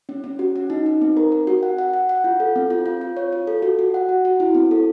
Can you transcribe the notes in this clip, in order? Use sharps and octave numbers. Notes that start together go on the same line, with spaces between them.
C#4
C#4
F#4
C#4
D#4
D#4
C4
A#4
A#4
F#4
F#5
F#5
F#5
F#5
F4
A4
C4
F4
F4
F4
C#5
F4
A4
F#4
F#4
F#5
F#4
F#4
E4
C4
A4